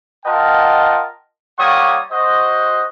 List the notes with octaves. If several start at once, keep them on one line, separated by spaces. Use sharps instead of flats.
F4 A#4 D#5 F#5 G5 A5
G3 A#3 C#5 F#5 C#6 D#6
F#4 C5 D#5